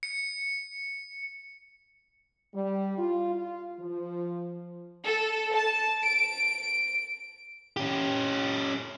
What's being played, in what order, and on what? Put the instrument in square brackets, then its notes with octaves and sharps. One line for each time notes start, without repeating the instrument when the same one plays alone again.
[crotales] C#7
[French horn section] G3
F4
F4
F3
[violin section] A4
A5
D7
[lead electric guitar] C#4 G4